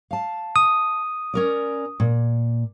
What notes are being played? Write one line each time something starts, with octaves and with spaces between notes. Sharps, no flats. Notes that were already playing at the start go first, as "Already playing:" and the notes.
F5 A5
D#6
C#4 A#4 D5
A#2